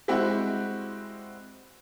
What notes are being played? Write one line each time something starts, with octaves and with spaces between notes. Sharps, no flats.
G3 G#3 C4 E4 F#4 G4